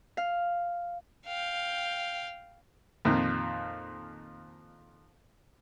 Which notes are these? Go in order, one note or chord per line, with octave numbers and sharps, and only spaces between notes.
F5
F5 G5
F2 A#2 D#3